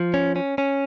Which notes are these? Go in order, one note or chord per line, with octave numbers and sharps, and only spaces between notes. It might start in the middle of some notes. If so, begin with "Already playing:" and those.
Already playing: F3
C#4
C#4
C#4